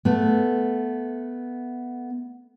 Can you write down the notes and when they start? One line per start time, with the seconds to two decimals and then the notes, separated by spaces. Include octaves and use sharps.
0.05 A3 B3